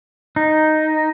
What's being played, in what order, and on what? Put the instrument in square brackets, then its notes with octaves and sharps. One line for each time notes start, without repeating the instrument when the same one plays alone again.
[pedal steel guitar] D#4